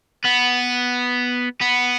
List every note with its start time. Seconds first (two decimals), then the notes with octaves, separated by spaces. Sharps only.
0.24 B3
1.61 B3